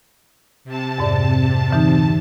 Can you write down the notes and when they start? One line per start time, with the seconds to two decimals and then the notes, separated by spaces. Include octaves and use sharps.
0.65 C3 A5
0.98 F2 G#2 D5
1.70 D3 E3 D#4